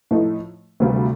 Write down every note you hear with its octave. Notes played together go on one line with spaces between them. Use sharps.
A2 F3 A3 D#4
D2 C3 G3 C4 F4